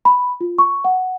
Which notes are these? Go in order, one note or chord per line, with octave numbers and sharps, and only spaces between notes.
B5
F4
C#6
F#5